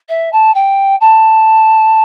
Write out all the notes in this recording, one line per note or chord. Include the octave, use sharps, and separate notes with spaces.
E5
A5
G5
A5